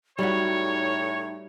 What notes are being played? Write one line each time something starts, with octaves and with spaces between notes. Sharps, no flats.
A2 G3 D#4 F#4 C#5